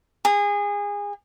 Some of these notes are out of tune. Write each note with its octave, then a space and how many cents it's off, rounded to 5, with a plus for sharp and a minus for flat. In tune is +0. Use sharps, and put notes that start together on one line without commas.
G#4 -25